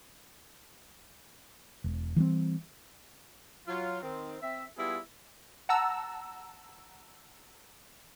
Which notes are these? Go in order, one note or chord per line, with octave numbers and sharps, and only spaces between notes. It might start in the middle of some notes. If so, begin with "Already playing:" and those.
E1
E3 G3 G#3 C4
F#3 F4
D#3 C4
C4 E5
G3 B3 E4 F4 G#4
F#5 A5 A#5 E6